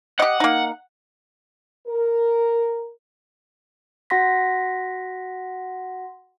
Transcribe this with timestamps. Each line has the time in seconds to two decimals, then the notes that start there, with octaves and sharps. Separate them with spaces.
0.20 G4 D#5 F#5
0.40 A#3 D#4
1.88 A#4
4.10 F#4 F#5 C6 A#6 B6